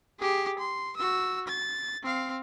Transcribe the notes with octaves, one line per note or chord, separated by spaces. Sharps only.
G4 G#4
C6
F#4 E6
A6
C4 F5